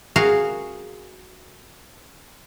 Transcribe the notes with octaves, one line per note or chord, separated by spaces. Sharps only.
F#4 G#4 A#4 F5